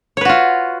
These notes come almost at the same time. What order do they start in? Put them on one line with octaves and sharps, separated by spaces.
C#5 B4 F#4 F4